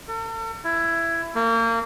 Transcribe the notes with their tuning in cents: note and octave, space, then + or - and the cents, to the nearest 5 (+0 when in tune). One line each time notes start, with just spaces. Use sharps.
A4 +45
E4 +15
A#3 -30